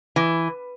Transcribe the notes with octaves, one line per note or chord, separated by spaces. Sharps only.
E3